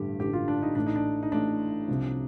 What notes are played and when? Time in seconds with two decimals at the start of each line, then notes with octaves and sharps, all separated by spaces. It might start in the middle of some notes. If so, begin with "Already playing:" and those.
Already playing: A1 G2 D3 A3 G4
0.20 A1 G2 D3 A3 G4
0.33 F4
0.48 D4
0.62 D#4
0.75 A1 A2 A3 D4
0.86 D#4
0.96 D4
1.23 D#4
1.32 A1 A2 A3 D4
1.88 C2 C3 F3